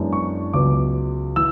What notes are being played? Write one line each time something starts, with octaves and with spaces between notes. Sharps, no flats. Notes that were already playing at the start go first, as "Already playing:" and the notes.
Already playing: F#2 E3 G#3 B3 D4
C#6
C#2 C#3 F#3 B3 D6
E3 E6